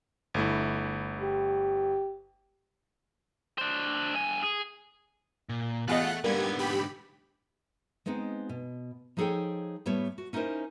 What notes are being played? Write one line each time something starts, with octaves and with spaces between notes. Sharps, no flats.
G1 A3 E4
G4
D4 C5
G2 G#5
G#4
A#2
E2 A3 F4 G#4 D#5 F#5 F#6
G#2 D3 G3 A#3 B3 B4 G#6
G4 B5
G#3 B3 C4 D#4
B2
F3 D#4 G#4 A4 C#5 G5
A2 G3 B3 C#5 A5
F#4
C#4 D#4 E4 G#4 A#4 C5